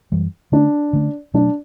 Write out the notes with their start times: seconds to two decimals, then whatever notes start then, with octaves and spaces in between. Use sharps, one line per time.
0.12 F#2 E3 G3
0.52 D3 A3 C#4 D4
0.93 D3 A3 C#4
1.34 B2 F#3 A3 C#4 D4